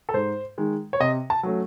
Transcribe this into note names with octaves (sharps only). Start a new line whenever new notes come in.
A4
G#2 C5
D#3 G#3
C#5
C3 D#5
A5
F#3 A3 C#4